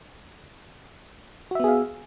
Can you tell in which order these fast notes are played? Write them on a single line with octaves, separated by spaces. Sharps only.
F#4 E5 B3 G#4 F5